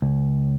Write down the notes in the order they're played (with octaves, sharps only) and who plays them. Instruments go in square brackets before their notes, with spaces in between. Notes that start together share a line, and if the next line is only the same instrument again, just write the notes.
[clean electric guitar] C#2